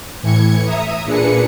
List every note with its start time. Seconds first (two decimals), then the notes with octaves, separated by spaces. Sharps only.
0.22 A2 E3 G#6 C#7
0.65 E5 A#5 D#6
1.04 A#2 D4 G#4 B4 C#7